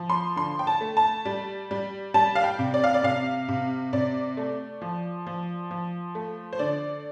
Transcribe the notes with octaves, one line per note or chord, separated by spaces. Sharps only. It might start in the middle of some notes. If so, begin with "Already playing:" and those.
Already playing: F3
C6
D3 C6
G5
A5
A3
A5
G3
G3
G3 A5
F5
G5
C3
D5
F5
D5
C3 F5
C3
C3 D5
A3
F3
F3
F3
A3
C5
D3 D5